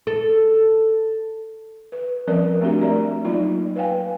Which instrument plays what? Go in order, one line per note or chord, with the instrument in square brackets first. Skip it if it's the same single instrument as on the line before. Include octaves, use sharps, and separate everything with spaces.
[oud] A4
[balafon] B4
F3 G3 C4 C#4 A#4 D5
A3 C4 D4 F#4 G4 A#4
G3 A3 D5 A#5
F#3 A#3 D#4 F4 D5
B4 C#5 F5 G5 G#5